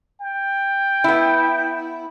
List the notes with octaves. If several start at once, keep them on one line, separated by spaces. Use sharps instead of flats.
G5
B3 E4